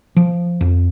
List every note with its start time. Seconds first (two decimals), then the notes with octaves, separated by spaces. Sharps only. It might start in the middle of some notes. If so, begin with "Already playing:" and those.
0.16 F3
0.61 F2